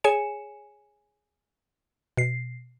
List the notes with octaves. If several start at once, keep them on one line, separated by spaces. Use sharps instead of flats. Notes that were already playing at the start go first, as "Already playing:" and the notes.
G#4 C#5 G#5 C#7 E7
B2 C7